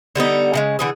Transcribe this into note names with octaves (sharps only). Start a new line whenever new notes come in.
D3 G3 B3 D#4
C#3 E3 G#3
D3 E3 G#4